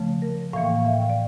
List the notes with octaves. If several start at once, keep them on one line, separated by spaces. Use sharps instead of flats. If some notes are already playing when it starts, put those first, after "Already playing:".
Already playing: C#3 F3 A3
A#4
A2 E3 A#3 F5
G5
F5
E5
G5
F5
D5